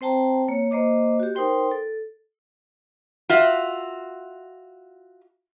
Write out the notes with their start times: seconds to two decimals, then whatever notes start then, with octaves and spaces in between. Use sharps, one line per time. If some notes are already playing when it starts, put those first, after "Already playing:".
0.01 C4 C5 G5 A5 A#5
0.48 A#3 C#5
0.71 A#3 C5 D#5 D6
1.19 F#4 G4
1.35 D#4 A#4 C5 G5 C6
1.71 A4
3.29 F4 F#4 E5